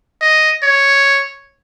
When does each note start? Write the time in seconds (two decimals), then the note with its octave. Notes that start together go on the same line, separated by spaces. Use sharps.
0.21 D#5
0.63 C#5